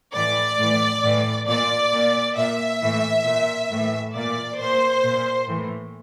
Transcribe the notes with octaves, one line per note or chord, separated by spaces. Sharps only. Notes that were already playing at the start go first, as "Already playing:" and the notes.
A2 E3 D5
A2 E3
A2 E3
A#2 D5
A#2
A#2 E5
A2 E3
A#2
A2 E3
A#2 D5
A#2 C5
A#2
A2 E3